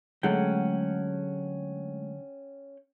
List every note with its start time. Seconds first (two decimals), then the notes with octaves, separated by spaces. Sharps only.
0.23 D3 F#3 G#3 A3 C#4 F#5 G5